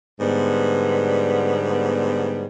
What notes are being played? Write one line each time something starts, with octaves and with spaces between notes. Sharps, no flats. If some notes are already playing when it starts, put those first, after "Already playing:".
G#2 D3 G3 B3